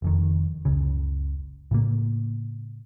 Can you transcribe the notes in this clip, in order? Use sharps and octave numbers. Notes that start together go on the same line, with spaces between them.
F1 F2 D#3
F#1 C#2 C#3
A2 C#3 A#3